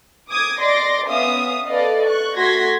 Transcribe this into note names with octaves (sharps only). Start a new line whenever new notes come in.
D6 D#6 G#6
D5 D#5 C6 D6 A#6
B3 C#4 E5 F5 D#6
A4 B4 D5 D#5 F5
C#6 F#6
A3 F#4 C6 G#6 A#6 B6